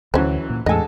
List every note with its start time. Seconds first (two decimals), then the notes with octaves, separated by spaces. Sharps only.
0.14 D2 E3 F#3 C#4 C5
0.50 A#2
0.66 E2 A2 D3 G#3 A4 D#5 G#5